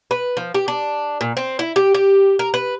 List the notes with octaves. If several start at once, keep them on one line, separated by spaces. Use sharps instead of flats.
B4
F3
G4
D4
A#2
C4
E4
G4
G4
A#4
B4